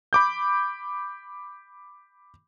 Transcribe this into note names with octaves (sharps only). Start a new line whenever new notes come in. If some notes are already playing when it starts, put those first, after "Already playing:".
B5 D6 G6